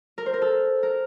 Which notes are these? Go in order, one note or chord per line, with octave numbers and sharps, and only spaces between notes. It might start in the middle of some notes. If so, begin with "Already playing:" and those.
A#4
C5
A#4
A4
A#4